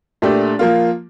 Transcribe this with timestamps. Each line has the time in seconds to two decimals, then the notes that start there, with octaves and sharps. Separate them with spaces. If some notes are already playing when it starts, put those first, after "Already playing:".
0.22 A#2 A3 D4 G4 D5
0.59 F3 A#3 F4